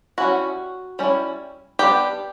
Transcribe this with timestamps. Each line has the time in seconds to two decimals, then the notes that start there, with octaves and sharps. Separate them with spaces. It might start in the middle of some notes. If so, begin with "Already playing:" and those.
0.18 G3 C#4 E4 F#4
0.99 G3 C#4 E4
1.79 G3 B3 D4 G4